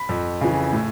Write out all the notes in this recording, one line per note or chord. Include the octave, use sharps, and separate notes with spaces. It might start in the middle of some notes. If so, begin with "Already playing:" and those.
Already playing: B5
F2
C#3 E3
A2